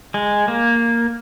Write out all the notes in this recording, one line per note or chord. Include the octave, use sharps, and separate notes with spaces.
G#3
A#3